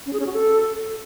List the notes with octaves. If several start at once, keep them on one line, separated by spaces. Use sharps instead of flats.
C#4
G#4
C#4
F#4
A4